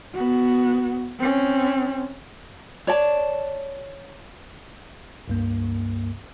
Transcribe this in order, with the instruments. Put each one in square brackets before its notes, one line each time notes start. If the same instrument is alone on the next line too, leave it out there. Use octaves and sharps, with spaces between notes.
[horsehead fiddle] B3 F#4
C4 C#4
[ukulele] C#5 D5 A5
[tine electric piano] C#2 G2 A#3